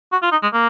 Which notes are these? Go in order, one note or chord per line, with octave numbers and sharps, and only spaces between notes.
F#4
F4
D#4
G#3
A#3